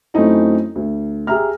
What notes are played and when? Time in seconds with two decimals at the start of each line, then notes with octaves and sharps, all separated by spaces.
0.14 F#2 A3 C4 C#4 D#4 E4
0.75 D2
1.27 G4 G#4 E5 A#5 F6